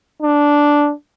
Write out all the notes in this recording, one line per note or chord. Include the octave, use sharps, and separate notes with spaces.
D4